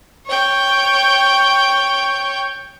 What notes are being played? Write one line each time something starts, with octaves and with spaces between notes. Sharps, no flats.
C#5 G5